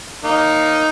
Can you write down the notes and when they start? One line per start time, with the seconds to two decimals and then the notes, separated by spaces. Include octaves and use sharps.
0.24 A#3 D#4